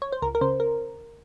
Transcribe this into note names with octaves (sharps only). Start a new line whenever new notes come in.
C#5
C5
C#2 A#4
A#4
C#3 C5
A#4